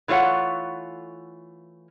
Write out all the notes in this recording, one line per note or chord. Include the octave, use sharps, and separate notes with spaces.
E3 A3 F4 C#5 F#5